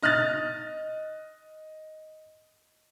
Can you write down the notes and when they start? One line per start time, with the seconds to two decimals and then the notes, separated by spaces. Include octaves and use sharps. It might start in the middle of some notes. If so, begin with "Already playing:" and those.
0.02 D#5 F6 F#6 A6